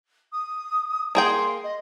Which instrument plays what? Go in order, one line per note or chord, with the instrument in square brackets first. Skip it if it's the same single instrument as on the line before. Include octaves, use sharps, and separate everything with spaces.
[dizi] D#6
[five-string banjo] A#3 G#4 G5 [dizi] C6
[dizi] D#5